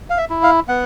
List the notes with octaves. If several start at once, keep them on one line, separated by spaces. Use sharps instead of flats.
F5
E5
E4
F5
B3 F#5